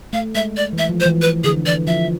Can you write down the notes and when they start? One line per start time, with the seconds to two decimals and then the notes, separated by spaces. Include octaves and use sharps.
0.13 A3 F5
0.35 G#3 E5
0.57 D5
0.73 E3
0.78 E5
0.89 F3
1.00 C5
1.06 E3
1.22 E3 B4
1.44 D3 G#4
1.66 E3 D5
1.87 F3 E5